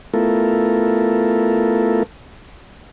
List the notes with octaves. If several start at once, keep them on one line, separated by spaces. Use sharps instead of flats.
A3 B3 E4 F4 A4 A#4